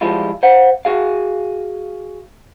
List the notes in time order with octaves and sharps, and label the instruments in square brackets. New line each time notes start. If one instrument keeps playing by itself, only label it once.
[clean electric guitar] F3 G3 G#3 E4 F4
C5 F5 F#5
F#4 G#4 F5